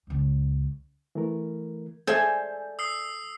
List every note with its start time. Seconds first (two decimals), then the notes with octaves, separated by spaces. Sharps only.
0.07 C#2 F#2
1.15 E3 A3 A#4
2.07 A4 C5 D5 E5 G#5 G6
2.79 D#6 E6 C7